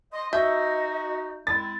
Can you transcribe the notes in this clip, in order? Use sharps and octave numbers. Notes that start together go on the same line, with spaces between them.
D#5 C6
D#4 F#4 D#5 E5 G6
G#3 C4 E4 A6